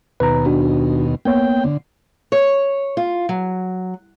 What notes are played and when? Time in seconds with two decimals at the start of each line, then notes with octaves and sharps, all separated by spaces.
0.20 D#2 B2 B4 A#5
0.46 D4 F#4
1.25 A#3 B3 C#5 G5
1.64 D3
2.32 C#5
2.97 F4
3.29 F#3